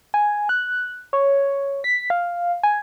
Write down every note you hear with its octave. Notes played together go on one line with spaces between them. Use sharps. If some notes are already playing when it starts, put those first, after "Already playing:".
G#5
F#6
C#5
B6
F5
G#5